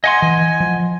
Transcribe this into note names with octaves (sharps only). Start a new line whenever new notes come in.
D#5 F#5 G#5 C6
E3 G#5
F3